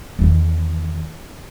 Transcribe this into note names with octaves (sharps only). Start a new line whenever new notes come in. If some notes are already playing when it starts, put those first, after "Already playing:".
E2 D#3